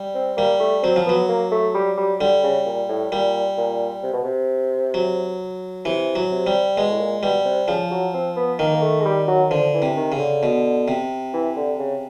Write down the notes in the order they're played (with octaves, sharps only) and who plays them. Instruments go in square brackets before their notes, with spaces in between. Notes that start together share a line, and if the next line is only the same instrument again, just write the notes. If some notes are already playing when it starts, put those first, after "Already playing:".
Already playing: [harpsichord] G3
[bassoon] C4
[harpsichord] G3 [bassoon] A#3
[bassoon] A3
[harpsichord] F#3 [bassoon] C4
[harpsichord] F3
[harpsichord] F#3 [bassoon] B3
[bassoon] A#3
A3
G3
G3
[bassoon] D3 [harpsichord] G3
[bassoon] C#3
A#2
A2
[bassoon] A#2 [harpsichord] G3
[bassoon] A#2
C3
B2
C3
[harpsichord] F#3
[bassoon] C3 [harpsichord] E3
[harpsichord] F#3
[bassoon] C3
[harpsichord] G3
[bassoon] B2 [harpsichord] G#3
[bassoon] A2
A#2
[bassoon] B2 [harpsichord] G3
[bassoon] C3
[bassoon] C#3 [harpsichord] F3
[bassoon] F#3
C4
B3
[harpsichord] D#3 [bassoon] A#3
[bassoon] A#3
A3
G#3
G3
F#3
[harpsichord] D3 [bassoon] F3
[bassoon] E3
[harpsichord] C3
[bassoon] D#3
[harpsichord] C#3
[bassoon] D3
[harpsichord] B2
C3
[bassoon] E3
D3
C#3